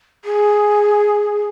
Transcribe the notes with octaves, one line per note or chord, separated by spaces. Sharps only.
G#4